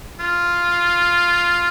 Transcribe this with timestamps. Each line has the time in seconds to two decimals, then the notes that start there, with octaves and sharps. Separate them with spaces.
0.20 F4